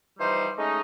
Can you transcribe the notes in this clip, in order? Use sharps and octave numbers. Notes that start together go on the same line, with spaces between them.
E3 F3 G3 D#4 C5
G#3 A3 C#4 D#4